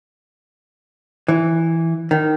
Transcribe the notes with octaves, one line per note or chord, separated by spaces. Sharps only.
E3
D#3